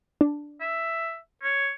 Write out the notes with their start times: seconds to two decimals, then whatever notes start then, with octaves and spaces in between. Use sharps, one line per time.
0.21 D4
0.61 E5
1.43 C#5